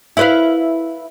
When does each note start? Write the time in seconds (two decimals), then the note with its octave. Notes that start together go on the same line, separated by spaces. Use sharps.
0.17 E4 B4 F5